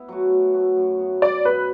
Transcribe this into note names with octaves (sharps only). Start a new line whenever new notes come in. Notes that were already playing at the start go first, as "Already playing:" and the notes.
Already playing: B3 E4
F#3 A3 F#4
B2
F#3 A3 F#4
F#2
F#3 B3
F#2 D5
F#3 B3 B4